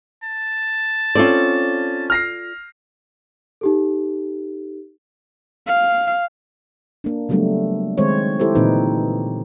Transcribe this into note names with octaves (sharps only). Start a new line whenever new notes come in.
A5
C4 C#4 F4 A4 D5
F6 A#6 C7
D#4 G4 A4
F5
A#3 D4
C#3 F#3 G3 A3 B3 D4
D#3 G#3 C4 C5 C#5
E4 G4 A4 C5
A#2 D3 E3 C4 D#4 B4